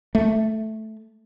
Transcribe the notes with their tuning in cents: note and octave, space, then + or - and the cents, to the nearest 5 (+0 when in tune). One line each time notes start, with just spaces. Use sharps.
A3 -5